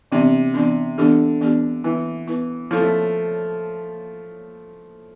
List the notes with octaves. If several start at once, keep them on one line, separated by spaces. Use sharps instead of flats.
C3 E3 B3 D4
E3 B3 D4
D3 E3 B3 D4 G4
E3 B3 D4 G4
E3 B3 E4 B4
B3 E4 B4
F3 C4 E4 A4
A3